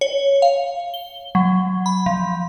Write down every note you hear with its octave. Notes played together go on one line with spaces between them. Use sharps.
C#5
F5
G7
F#3
B5
F3